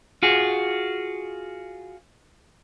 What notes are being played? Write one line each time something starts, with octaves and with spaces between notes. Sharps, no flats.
F4 F#4 G#4